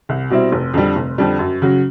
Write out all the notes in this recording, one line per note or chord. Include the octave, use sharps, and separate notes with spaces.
C2
B2 G3 C4 E4
F1
F2 D3 G3
F1
F2 D3 G3
F#2
C#3 F#3